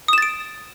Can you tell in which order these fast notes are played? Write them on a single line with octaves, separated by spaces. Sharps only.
D#6 E7 A6 D7